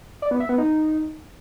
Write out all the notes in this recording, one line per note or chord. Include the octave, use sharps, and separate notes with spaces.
D5
B3
E5
B3
D#4